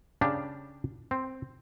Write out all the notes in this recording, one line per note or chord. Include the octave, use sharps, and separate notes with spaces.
C#3 D4 G4
C4